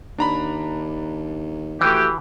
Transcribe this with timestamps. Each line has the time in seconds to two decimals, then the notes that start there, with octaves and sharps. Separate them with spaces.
0.18 D#2 D4 A#5 B5
1.81 E3 A3 F#4 G4